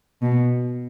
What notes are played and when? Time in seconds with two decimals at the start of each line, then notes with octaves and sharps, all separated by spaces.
0.22 B2